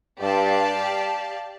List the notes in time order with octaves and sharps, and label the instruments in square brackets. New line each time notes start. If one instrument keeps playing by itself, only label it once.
[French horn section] G2 [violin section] G4 D5 F5 A5